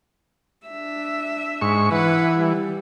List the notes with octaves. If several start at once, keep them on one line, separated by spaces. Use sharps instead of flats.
D4 E5
G#2 C#6
E3 B4 F#5
G3